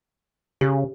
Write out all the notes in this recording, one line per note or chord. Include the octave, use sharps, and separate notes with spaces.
C#3 G4